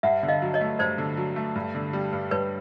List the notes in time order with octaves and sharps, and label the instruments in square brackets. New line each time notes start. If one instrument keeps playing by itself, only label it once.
[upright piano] G2 [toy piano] E5 F#5
[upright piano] D3
[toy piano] D#5 F5
[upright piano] F#3
[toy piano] C#5 D#5
[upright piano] A3
[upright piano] G2 [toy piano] C5 D5
[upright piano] D3
F#3
A3
G2
D3
G3
G2
[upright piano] G2 [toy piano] B4 C#5